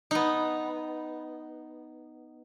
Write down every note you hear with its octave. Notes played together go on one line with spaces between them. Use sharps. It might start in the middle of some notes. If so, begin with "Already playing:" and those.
B3 D#4